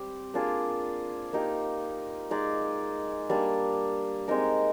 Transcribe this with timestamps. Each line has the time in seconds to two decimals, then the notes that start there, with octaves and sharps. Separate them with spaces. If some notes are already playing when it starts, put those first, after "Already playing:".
Already playing: G3 C4 G4
0.34 A#3 D4 F4 G#4
1.33 A#3 D#4 G4
2.31 G#3 D#4 G#4 D5
3.30 G3 A#3 D4
4.28 G#3 C4 D#4 A#4